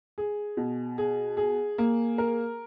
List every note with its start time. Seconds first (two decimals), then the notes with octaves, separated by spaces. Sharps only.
0.18 G#4
0.57 B2
0.98 G#4
1.37 G#4
1.78 A#3
2.18 A#4